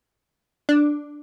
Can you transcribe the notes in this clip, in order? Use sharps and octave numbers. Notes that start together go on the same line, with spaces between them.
D4